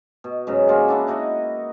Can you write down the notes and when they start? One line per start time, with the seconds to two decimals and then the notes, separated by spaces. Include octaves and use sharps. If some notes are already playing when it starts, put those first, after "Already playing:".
0.24 B2
0.47 G#2 C#3 F#3
0.68 A#3 F4 F#4 G#4
0.89 D4 E4 F#4
1.07 D#4 E4 F#4 D#5